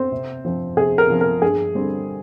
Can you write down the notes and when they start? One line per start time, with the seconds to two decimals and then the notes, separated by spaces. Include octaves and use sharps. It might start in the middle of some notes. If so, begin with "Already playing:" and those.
Already playing: C4 C5
0.12 C3
0.45 F3 C4
0.77 C3 G#4
0.98 A#4
1.10 F3 C4
1.21 A#4
1.42 G2 G#4
1.75 D3 G3 C4